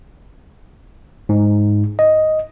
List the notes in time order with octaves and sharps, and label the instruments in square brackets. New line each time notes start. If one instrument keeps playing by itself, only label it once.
[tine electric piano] G#2
D#5